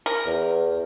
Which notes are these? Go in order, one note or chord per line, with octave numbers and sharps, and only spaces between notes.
A#4
E2